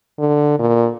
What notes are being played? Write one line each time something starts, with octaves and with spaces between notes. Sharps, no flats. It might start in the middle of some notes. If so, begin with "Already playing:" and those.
D3
A#2